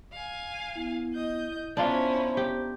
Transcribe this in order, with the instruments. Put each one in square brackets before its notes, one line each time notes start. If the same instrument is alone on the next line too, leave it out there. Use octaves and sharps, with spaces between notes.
[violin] F5 G#5
[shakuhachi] B3 [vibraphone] E4
[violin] D#5 G6
[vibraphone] B3 A#5 [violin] C#4 E4 [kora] D4 F4 [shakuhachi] C5
[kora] G4